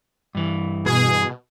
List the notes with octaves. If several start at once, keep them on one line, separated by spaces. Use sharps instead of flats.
G2 E3
B2 G#4